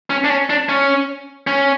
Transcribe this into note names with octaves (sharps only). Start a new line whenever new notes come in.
C#4
D4
C#4
D4
C#4
C#4